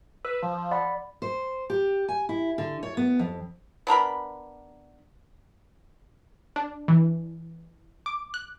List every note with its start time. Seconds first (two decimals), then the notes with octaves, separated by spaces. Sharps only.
0.25 B4 E6
0.43 F3
0.71 D5 F#5 B5
1.22 C5
1.70 G4
2.08 G#5
2.29 E4
2.58 D3
2.83 C#5
2.97 B3
3.19 F2
3.87 B3 D4 A#4 B5
6.56 D4
6.88 E3
8.06 D6
8.34 F#6